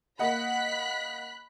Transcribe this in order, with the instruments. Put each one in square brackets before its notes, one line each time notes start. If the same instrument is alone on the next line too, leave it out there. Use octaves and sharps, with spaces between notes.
[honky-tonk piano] A#3 D#5 F#5 [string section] B5 F#6 B6